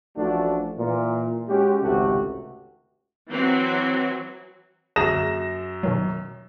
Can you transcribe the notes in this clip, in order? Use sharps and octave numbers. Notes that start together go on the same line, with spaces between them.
A1 F3 A3 D4 F#4
A#2 E3
G#3 C#4 F#4 G4
G#1 C#2 C3 A3 F#4 G4
E3 F#3 C4 F#4
F#2 D3 A#3 G#4 A#6 E7
B2 D#3 F#3